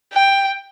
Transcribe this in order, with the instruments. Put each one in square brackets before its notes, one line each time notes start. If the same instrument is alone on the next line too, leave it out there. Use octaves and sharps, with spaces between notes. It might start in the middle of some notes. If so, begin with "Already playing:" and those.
[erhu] G5